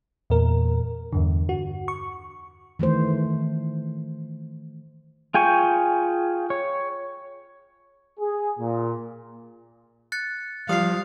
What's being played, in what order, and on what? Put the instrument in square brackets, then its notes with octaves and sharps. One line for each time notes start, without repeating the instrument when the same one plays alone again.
[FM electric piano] E2 A#2 A#4
E2 G2 D3
F#4
C#6
[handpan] D#3 E3 A3 C5
[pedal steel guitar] F4 G#4 G5 G#5 C#6
C#5
[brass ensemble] G#4
A#2
[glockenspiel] F#6 A6 C#7
[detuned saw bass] F3 [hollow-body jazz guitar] G3 [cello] F5 [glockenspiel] D#6 C7